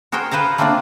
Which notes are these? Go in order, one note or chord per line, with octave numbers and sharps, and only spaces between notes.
F#4 G#4 A#4 C5 G5
G#4 B4 C5 F5 A#5
A3 A#3 C4 D4 F4 D5